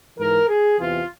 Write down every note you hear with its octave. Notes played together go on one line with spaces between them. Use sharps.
G#2 E3 A#4
G#4
E2 C3 E3 F4